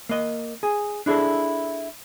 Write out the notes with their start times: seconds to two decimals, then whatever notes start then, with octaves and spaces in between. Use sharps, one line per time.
0.09 A#3 D#5
0.63 G#4
1.06 D4 E4 G#4 A4